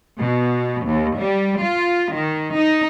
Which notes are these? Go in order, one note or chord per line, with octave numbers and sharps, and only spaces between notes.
B2
D#2
G3
F4
D#3
D#4